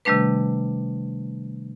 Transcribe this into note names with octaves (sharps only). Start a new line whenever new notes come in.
C3 D#3 G3 A3 D4 B4